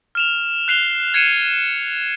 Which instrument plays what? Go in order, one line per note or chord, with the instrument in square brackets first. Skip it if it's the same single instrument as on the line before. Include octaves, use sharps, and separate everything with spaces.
[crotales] F6 E7 F7
F#6 C7 F7 G7
G#6 C7 C#7 D#7 E7